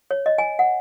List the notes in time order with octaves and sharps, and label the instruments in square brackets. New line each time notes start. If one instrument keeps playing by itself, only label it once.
[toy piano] C#5
D#5
G#5
F#5